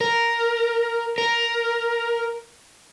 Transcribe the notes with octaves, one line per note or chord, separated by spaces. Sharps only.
A#4
A#4